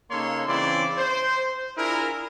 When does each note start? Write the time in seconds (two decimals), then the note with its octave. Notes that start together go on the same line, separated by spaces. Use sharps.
0.11 C#3 A#3 D#4 A4 C#5 C6
0.48 C#3 E3 C4 E4 D5 C6
0.97 C5
1.78 D4 E4 F4 G#4 A#4